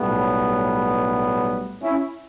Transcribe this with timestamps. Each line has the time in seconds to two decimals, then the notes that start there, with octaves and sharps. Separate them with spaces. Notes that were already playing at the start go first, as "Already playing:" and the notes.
Already playing: B1 A2 G3 B3
1.81 C#4 E4